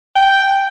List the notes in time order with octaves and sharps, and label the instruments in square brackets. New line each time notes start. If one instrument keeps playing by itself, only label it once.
[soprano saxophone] G5